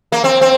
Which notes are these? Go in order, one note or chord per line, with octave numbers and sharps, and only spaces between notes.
A#3
C4
C4